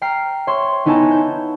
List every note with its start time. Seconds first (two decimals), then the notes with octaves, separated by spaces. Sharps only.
0.01 G5 A#5 F6 C7
0.47 C#5 E5 C6 C#6
0.85 B3 D#4 E4 C#5 G#5 A5
1.11 G6 E7